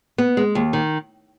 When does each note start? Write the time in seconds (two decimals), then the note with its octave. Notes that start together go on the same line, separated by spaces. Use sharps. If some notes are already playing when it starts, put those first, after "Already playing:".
0.18 B3
0.37 G#3
0.55 D#2
0.73 D#3